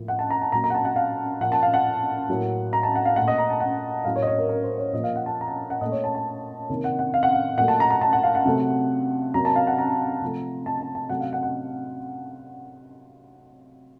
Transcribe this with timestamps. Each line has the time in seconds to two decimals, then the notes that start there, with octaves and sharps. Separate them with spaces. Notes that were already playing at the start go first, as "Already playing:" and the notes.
Already playing: A2 F3 A#3
0.08 F#5
0.19 A5
0.30 A#5
0.42 A5
0.52 A#2 F#3 A#3 A#5
0.64 A#5
0.70 F#5
0.75 A5
0.85 F#5
0.96 F5
1.40 A#2 F3 A#3 F#5
1.52 A5
1.63 F5
1.74 F#5
2.28 A2 F#3 A#3
2.73 A#5
2.83 A5
2.95 F#5
3.05 F5
3.16 A3 F#5
3.21 A#2
3.28 D#5
3.38 A#5
3.50 A5
3.60 F#5
4.04 A2 F#3 A#3 F5
4.16 C#5
4.22 D#5
4.27 C#5
4.39 A#4
4.49 A#4
4.63 C5
4.78 C#5
4.93 A#2 F3 A#3 D#5
5.04 F5
5.16 F#5
5.26 A5
5.41 A#5
5.48 A5
5.70 F#5
5.81 A#2 A3 D#5
5.92 C#5
6.04 A5
6.15 A5
6.69 C3 D#3 A#3
6.84 F#5
6.99 F#5
7.14 F5
7.23 F#5
7.33 F5
7.57 A#2 F#3 A3 F#5
7.68 A5
7.80 A#5
7.91 A#5
8.01 A5
8.13 F#5
8.23 F5
8.35 F#5
8.45 C3 F#3 A3
9.34 C3 F#3 A#3 A#5
9.45 A5
9.56 F5
9.67 F#5
9.79 A#5
10.21 C3 F3 A3
10.66 A5
10.81 A5
10.95 A5
11.10 C3 F#3 A3 F#5
11.21 F5
11.33 F#5
11.43 F#5